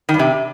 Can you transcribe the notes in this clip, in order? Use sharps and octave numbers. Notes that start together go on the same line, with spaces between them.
D#3
G2
C3